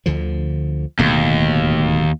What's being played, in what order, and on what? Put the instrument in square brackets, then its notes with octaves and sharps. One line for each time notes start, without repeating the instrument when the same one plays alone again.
[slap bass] D2 D3 F3
[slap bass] D1 B2 A3 [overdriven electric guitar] D#2